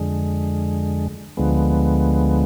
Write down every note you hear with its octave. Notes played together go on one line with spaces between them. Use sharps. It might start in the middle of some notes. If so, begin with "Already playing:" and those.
Already playing: F2 D3 G#3
D2 D3 F3 G#3 B3